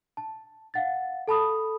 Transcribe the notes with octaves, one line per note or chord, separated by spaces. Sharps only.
A5
F5 F#5 A6
A4 A5 B5 D#6